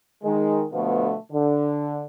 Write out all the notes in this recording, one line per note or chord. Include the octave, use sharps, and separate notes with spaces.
D#3 G#3
B2 D3 F3 A3 B3
D3